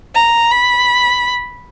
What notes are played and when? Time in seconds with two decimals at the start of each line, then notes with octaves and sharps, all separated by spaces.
0.15 A#5
0.52 B5